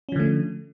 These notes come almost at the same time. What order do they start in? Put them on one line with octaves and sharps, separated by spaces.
C#4 F3 D3 A3